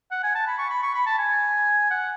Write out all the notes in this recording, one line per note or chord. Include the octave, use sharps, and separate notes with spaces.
F#5
G#5
A5
B5
C#6
B5
C#6
B5
A5
G#5
F#5